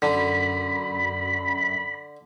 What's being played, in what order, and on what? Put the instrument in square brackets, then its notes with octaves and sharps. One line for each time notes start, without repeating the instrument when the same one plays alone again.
[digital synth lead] F#2 [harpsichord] D3 [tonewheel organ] B5